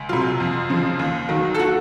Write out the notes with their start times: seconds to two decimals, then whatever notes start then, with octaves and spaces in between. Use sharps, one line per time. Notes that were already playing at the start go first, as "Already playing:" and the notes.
Already playing: C#2
0.09 C3 F#3 F4
0.40 F2
0.70 C#3 F3
0.99 D#2
1.29 D#3 F#3
1.55 A4
1.59 F#4